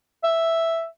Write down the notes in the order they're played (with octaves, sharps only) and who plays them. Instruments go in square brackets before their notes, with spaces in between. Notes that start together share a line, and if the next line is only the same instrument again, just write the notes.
[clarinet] E5